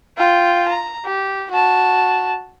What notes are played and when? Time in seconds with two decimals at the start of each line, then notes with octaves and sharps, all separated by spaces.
0.18 F4 G5
0.68 A#5
1.05 G4
1.51 F#4 A5